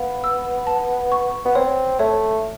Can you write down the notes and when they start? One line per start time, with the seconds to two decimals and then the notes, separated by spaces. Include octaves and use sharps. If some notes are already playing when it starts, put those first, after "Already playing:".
Already playing: B3 F5
0.24 E6
0.67 A5
1.12 C#6
1.45 B3
1.55 C4 C#5
1.99 A3 C#5